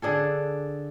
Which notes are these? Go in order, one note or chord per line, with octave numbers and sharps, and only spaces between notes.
D3 D4 G#4 A4